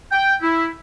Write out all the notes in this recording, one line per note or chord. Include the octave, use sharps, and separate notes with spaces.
G5
E4